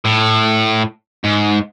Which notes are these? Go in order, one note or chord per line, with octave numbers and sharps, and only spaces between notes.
A2
G#2